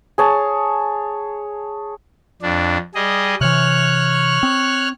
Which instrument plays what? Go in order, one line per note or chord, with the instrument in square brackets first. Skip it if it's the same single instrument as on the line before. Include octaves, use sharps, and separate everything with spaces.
[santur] G#4 C#5 A5
[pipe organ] F2 D4
G3 G#4 D#5
[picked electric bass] C3 E3 [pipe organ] C#5 F6 F#6
[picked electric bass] C4